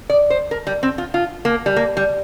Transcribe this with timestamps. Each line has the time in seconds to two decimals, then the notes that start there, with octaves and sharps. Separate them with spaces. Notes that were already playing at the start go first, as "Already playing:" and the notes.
0.10 D5
0.30 C5
0.51 A#4
0.67 G3
0.83 C4
0.98 F4
1.14 F4
1.45 A#3
1.66 G3
1.76 A#3
1.97 G3